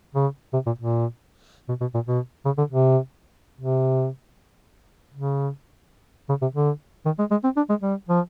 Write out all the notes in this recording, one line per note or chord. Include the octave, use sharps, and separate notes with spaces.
C#3
C3
A#2
A#2
B2
B2
A#2
B2
C#3
D3
C3
C3
C#3
C#3
C3
D3
D#3
G#3
G#3
C4
D4
G#3
G3
F3